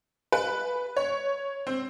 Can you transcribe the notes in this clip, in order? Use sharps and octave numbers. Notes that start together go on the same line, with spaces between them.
B4
C#5
C4